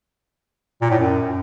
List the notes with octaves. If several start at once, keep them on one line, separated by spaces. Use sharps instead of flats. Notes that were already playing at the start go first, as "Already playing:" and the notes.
A#2
A2
F#2